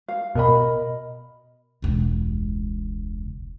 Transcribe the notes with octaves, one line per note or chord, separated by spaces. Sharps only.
F5
B2 A#4 D#5 B5
E1 C#2